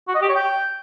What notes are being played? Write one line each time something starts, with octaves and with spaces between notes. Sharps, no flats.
F#4
D#5
G4
C#5
G5